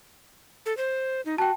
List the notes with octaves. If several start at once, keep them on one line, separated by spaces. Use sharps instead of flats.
A4
C5
D#4
F#4 G5 A5